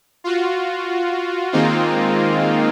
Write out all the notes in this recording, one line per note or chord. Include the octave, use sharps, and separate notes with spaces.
F4 F#4
D#3 G#3 A#3 C4 D#4 F4